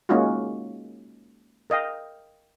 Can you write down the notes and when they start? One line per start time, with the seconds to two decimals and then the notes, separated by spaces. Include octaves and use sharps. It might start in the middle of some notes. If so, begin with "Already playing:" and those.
0.09 G#3 A#3 C#4 D#4 F4 F#4
1.70 A#4 D#5 F5 G5